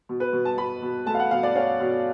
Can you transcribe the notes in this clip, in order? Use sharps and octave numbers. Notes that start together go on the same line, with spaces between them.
B2
B4
B2
A5
B2 B5
B2
A3 A5
F5
F#5
B2 F5
D5
C#4 F5
B2